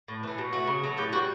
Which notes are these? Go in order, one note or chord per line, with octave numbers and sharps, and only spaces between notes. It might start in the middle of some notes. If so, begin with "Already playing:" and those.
A2
E3 A3
B2
A3 F#4
C#3
F#3 A3
A2 G4
G3 F#4